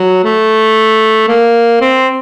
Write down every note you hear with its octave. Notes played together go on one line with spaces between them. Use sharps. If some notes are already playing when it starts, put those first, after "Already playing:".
Already playing: F#3
A3
A#3
C4